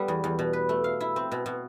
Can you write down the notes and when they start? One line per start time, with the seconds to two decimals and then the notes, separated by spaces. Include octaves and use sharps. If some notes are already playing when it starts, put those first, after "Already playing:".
Already playing: G3 B3 A4
0.08 E2
0.24 E2
0.39 B2
0.53 B4
0.69 A3
0.84 F5
1.01 E4
1.16 C4
1.32 B2
1.46 B2